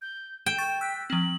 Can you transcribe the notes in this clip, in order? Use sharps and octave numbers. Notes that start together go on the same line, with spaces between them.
G6
G5 E7
C#6 A6
E6 F#6 B6
F3 C4 F#7